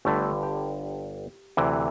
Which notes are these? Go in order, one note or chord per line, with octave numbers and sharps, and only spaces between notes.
G1 G2 D3 A3
G4
D2 C3 E3